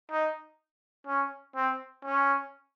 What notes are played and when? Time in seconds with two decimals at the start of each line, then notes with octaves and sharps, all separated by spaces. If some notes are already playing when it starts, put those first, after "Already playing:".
0.11 D#4
1.07 C#4
1.56 C4
2.04 C#4